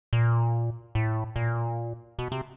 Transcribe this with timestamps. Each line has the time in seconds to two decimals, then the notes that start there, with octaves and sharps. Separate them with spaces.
0.13 A#2
0.95 A2
1.36 A#2
2.19 B2
2.32 C3